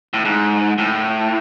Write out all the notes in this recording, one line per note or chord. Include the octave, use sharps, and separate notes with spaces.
A2
G#2
A2